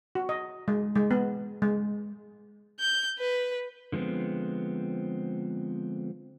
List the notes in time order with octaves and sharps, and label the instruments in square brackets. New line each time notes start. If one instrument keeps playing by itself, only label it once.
[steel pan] F#4
D#5
G#3
G#3
B3
G#3
[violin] G6
B4
[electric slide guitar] D3 F3 G#3 B3 C4